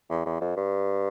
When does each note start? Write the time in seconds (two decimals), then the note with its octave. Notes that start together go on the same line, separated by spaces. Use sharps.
0.10 E2
0.26 E2
0.41 F2
0.57 G2